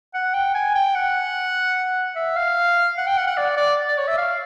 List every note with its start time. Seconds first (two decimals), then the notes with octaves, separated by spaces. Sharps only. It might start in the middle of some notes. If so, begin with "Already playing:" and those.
0.14 F#5
0.34 G5
0.55 G#5
0.75 G5
0.95 F#5
2.16 E5
2.36 F5
2.98 F#5
3.07 G5
3.17 F#5
3.27 F#5
3.37 D5
3.57 D5
3.88 D5
3.98 C#5
4.08 E5
4.18 F5